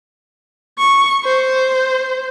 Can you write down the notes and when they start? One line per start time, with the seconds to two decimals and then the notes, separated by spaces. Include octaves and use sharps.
0.78 C#6
1.24 C5